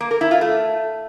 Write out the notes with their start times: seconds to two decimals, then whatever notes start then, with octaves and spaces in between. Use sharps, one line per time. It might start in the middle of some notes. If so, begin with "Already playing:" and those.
0.01 A#3
0.11 A#4
0.21 E4
0.31 F4
0.41 A3